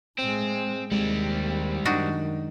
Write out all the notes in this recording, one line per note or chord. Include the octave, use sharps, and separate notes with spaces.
A2 G#3 C4
D#2 G3 G#3 C4
F#2 D#3 D4 D#4 F#4